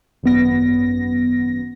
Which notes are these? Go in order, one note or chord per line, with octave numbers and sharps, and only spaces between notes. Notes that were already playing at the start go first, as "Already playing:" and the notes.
G#1 F#2 B3 A#6